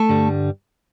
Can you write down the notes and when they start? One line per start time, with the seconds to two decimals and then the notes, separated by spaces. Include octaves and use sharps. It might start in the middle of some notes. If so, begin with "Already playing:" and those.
Already playing: A3 A4
0.09 G2 D3 G3